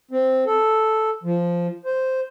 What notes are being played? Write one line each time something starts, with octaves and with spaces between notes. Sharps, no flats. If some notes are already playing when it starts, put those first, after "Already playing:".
C4
A4
F3
C5